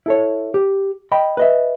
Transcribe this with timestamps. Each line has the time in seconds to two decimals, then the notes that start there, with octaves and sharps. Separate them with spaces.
0.06 E4 A4 C#5
0.54 G4
1.12 D#5 G5 B5
1.37 B4 D#5 E5